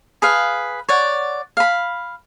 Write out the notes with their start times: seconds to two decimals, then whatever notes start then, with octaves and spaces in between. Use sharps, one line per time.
0.22 G#4 B4 F5
0.89 C#5 D5 F#5
1.57 F5 B5